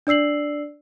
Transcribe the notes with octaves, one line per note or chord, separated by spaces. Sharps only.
D4 D5 E6 C7 F#7